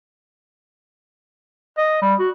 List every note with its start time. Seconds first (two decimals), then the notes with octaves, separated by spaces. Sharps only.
1.78 D#5
2.02 G3
2.19 F#4